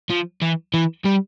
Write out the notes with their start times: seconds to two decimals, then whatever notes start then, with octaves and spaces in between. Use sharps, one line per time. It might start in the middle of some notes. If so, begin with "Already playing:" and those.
0.10 F3
0.42 E3
0.74 E3
1.05 G3